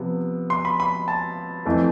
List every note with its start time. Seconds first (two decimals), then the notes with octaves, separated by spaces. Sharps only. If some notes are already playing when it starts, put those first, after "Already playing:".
Already playing: C3 F3 B3
0.50 C6
0.65 B5
0.80 B5
1.08 A5
1.65 F2 E3 A3